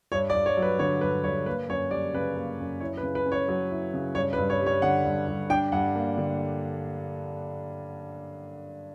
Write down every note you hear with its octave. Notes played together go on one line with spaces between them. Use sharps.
G2 C#5
D5
G2
C#5
F#3
B4
D3 C#5
G2 B4
G2 C#5
A#3 B4
F#2 C#5
G3 D5
C#3 B4
A#3
F#2
E4 C#5
B4
C#3
B4
C#4
C#5
F#3 C#5
E4
C#3
G2 C#5
B4
G2
C#5
G3
C#5
D3 F#5
G2
G2
D4 G5
G2 F#5
A#3
D3